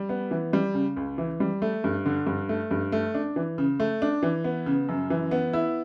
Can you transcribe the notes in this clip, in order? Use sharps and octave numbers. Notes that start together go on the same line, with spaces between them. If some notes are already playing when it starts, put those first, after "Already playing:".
Already playing: G3
B3
E3
G3
C#3
C#2
E3
G3
A3
G2
D3
G2
A3
G2
A3
D4
E3
C#3
A3
D4
E3
B3
C#3
F#2
E3
B3
E4